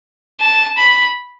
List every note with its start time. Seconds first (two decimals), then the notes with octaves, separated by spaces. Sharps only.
0.41 A5
0.78 B5